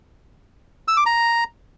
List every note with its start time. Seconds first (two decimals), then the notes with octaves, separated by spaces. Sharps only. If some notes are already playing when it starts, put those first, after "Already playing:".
0.88 E6
0.97 D6
1.06 A#5